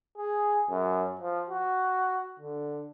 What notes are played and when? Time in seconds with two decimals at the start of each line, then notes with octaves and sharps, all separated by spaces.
0.18 G#4
0.70 F#2
1.20 F3
1.50 F#4
2.39 D3